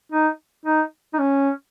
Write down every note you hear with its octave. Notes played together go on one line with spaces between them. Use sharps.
D#4
D#4
D#4
C#4